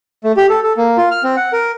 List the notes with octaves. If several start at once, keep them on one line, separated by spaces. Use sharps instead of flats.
A3
G4
A4
A4
A#3
F4
F6
C4
F#5
A#4